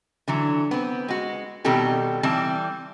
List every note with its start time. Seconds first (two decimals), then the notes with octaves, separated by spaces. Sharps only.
0.28 D3 E3 F#3
0.71 B3 C4
1.08 G#3 F#4
1.64 B2 D#3 G3 C4 G4 A4
2.23 E3 G3 C4 A5